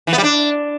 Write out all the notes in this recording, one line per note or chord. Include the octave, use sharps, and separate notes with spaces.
E3
B3
G3
D4